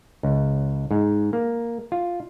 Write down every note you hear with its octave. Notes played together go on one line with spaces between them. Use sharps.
C#2
G#2
A#3
F4